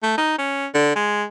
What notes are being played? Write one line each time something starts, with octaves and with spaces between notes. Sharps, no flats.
A3
D#4
C#4
D3
G#3